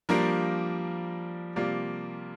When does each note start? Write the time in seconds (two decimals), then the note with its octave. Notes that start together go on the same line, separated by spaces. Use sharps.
0.09 F3 G3 A#3 D4 A#4
1.56 C3 G3 A#3 F4 D5